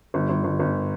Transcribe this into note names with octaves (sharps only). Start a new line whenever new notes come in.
G1
G1
G1
G1